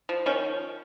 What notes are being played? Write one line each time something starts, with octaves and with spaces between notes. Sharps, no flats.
F3
D#3 C#4